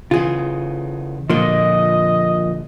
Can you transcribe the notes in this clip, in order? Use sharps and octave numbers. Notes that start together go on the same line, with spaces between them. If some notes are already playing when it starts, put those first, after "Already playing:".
C#3 E3 F4 G#4
A#2 D3 F3 A#3 D#5